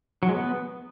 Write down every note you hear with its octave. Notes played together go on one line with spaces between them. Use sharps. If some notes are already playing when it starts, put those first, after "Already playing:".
F#3
G#3
B3